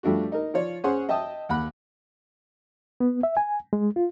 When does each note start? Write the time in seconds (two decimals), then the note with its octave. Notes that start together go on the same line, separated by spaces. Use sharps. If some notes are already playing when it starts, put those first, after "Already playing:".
0.03 F3 G3 A3 D4 F#4
0.32 D#4 A#4
0.54 F3 F4 C#5 D5
0.84 C#4 G#4 C5 C#5 F#5 C6
1.09 D#5 E5 G5 A5 D#6
1.49 D#2 F#5 B5 F#6
3.00 B3
3.23 E5
3.37 G#5
3.73 G#3
3.96 F4